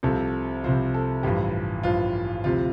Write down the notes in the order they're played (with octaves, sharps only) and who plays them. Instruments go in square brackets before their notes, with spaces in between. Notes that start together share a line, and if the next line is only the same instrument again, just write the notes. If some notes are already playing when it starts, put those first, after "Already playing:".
[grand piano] C2 C3 F3 A4
C2 C3 F3 C5
A4
A1 G2 F3 G4
A1 G2 F3 F4
D2 C3 F3 F4